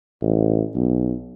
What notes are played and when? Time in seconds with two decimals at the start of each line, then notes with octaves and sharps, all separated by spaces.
0.22 A1
0.75 B1